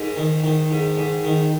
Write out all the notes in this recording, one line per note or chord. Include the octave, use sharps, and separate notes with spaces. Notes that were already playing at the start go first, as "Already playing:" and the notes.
Already playing: G#2 A#4
D#3
D#3
G#2
G#2
D#3